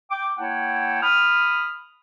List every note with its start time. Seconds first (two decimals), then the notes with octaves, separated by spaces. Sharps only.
0.11 G5 D6
0.38 A#3 E4 C#5 F#5 G5 A5
1.02 B5 D#6 F6